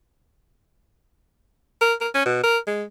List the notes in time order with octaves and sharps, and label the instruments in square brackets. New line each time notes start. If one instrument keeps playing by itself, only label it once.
[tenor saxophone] A#4
A#4
C#4
B2
A#4
G#3